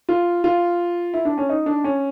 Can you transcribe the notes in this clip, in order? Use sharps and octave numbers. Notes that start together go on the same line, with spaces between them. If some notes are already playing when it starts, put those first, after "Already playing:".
F4
F4
E4
D4
C#4
D#4
D4
C#4